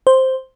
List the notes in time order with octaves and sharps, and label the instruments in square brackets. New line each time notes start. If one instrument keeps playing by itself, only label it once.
[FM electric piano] C5